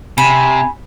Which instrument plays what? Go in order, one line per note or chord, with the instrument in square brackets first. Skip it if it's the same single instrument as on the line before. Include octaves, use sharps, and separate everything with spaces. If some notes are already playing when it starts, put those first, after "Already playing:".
[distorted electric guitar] C3 [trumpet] G#5 [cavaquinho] B5